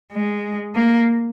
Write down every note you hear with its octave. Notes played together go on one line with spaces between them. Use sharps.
G#3
A#3